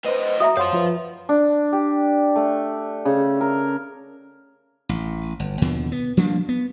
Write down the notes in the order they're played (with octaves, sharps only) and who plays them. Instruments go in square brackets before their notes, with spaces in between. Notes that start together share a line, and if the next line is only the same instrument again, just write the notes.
[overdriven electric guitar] A2 D#5 [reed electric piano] B4 C5
[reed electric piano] F#4 A#5 [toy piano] E5 D#6
[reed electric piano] F#2 [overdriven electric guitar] C5 F5 [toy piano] C#5 F#5 C6
[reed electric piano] F3 F4 B4
[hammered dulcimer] D4
G4
A3
C#3
A#4
[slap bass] A1
G1
D#2 B2 D3 F3
B3
F3 G3 A#3 D4
B3